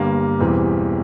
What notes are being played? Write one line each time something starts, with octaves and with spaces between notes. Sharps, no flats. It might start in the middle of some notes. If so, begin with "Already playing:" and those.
Already playing: G1 G2 G3 A#3
E1 E2 E3 G3 C4